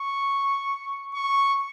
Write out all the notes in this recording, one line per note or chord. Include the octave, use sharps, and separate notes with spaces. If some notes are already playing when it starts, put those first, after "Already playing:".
Already playing: C#6
C#6